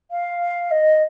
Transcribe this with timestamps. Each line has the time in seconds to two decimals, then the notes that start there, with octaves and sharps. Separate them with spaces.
0.11 F5
0.71 D#5